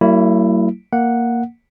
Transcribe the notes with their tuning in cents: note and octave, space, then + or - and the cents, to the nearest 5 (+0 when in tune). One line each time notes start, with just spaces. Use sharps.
F#3 +35 A#3 -40 E4 +5
A#3 +0 F#5 -5